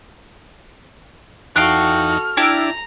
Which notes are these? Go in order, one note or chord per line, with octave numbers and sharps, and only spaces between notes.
E2 D#4 F#4 A4 F5 G5 F6 F#6
D4 E4 G4 A5 A#5